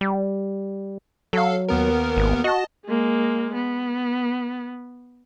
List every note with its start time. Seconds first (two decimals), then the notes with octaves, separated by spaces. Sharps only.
0.01 G3
1.33 F#3 A4 F5
1.68 D#2 B3 A#4
2.16 G#1
2.44 F#4 D#5 A5
2.86 G#3 A#3
3.54 B3